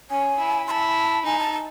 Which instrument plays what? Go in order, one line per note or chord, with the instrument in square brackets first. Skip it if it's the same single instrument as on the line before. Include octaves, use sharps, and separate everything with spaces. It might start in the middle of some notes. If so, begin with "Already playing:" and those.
[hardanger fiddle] C#4 [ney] G#5
[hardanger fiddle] E4
[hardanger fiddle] E4 [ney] A5 C6
[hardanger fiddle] D#4 [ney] G#5
[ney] A5
A5